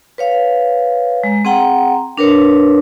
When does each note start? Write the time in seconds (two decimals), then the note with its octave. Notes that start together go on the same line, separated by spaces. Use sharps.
0.18 B4 C#5 F5
1.23 G#3
1.45 C4 G#4 F#5 G5 A#5
2.17 D4 A#4 B4 C#5